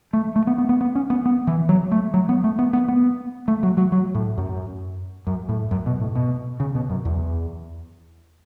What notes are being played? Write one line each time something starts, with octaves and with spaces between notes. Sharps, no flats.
A3
A3
B3
B3
B3
B3
C#4
B3
B3
E3
F#3
A3
F#3
B3
A3
B3
B3
B3
A3
F#3
F#3
F#3
A2
F#2
F#2
A2
F#2
B2
A2
B2
C#3
B2
F#2
E2